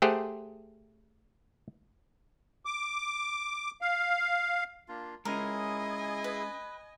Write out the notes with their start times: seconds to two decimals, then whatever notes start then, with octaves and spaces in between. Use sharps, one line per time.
0.02 A3 G4 G#4 C5 F#5
2.65 D6
3.81 F5
4.88 A#3 D4 F4
5.25 G#3 C#4 E4 G#4 A#4 D#5 G#5
6.24 B4